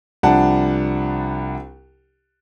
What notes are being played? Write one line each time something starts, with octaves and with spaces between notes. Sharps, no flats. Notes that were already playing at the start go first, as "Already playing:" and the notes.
C2 F3 D4 F#5 A5